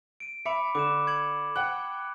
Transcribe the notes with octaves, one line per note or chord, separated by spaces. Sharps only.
D7 D#7
E5 B5 D6 C#7
D3 D6 E7
G#6 C#7 F#7
F#5 G5 F#6